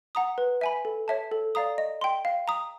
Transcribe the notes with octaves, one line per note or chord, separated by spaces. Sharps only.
F#5 A#5 D#6
B4
E5 G#5 B5
A4
C#5 E5 A5
A4
D5 F5 A#5 D#6
D#5
G5 C6
F5
A#5 D#6